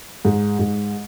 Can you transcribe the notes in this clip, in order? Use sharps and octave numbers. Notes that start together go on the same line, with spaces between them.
G#2
G#2